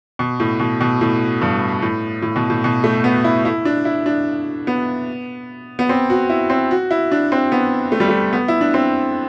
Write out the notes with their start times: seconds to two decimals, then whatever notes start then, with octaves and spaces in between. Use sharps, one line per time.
0.19 B2
0.40 A2
0.60 B2
0.81 B2
1.01 A2
1.42 G2
1.82 A2
2.22 A2
2.36 B2
2.50 A2
2.64 B2
2.84 A3
3.04 B3
3.24 E4
3.45 E4
3.65 D4
3.85 E4
4.06 D4
4.67 B3
5.79 B3
5.89 C4
6.10 F#4
6.30 E4
6.50 C4
6.71 F#4
6.91 E4
7.12 D4
7.32 C4
7.52 B3
7.92 A3
8.00 G3
8.08 A3
8.33 B3
8.48 E4
8.61 D4
8.74 C4